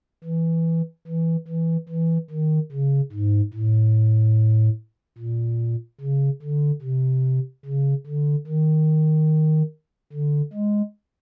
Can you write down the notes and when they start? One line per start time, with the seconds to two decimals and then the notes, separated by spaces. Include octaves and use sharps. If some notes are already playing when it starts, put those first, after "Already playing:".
0.24 E3
1.07 E3
1.48 E3
1.89 E3
2.30 D#3
2.72 C#3
3.12 G#2
3.53 A2
5.18 A#2
6.00 C#3
6.42 D3
6.82 C3
7.65 C#3
8.06 D3
8.47 D#3
10.13 D3
10.53 G#3